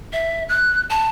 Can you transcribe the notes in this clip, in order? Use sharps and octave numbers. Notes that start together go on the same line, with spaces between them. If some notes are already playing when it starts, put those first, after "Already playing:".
E5
F#6
A5